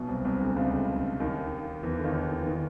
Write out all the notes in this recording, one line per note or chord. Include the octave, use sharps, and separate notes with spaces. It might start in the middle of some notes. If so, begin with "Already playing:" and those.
Already playing: B1 B2
C2 C3
C2 C3
D2 D3
C#2 C#3
D#2 D#3
E2 E3
D3
D#2 D#3
E3
D#3